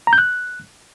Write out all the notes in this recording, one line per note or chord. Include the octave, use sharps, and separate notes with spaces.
A#5
G6
F#6